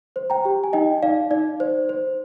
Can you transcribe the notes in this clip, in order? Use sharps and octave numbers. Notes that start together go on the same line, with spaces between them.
C5
G5 A#5
G4
G#5
D#4 D#5 G5
D#4 D5 F5
D#4 D5
C5
C5